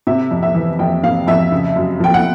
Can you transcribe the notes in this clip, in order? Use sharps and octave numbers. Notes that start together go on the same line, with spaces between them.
C3 E5
F2
E5
E3
F2 G5
C3 F5
F2 E5
C#3
F#2
F3 G5
F#5